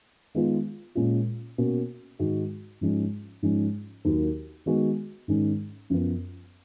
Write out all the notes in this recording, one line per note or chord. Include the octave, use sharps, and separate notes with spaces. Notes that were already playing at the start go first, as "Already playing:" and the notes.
D#3 G#3 B3 F4
A#2 G#3 C#4 F4
B2 A#3 C#4 F#4
G#2 D#3 G#3 D#4 F#4
G#2 F3 G#3 C#4
G#2 F3 G#3 C#4
D#2 D#3 F#3 A#3
D#3 G#3 B3 F#4
G#2 D#3 G#3 C#4
F#2 F3 B3